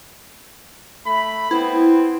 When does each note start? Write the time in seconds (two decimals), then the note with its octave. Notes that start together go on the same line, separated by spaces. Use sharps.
1.06 A3 B5
1.51 B3 C4 E4